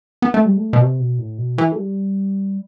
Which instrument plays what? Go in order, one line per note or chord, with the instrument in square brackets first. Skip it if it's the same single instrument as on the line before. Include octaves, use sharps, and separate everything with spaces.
[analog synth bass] B3
A3
G3
A3
B2
C3
B2
A2
B2
E3
A3
G3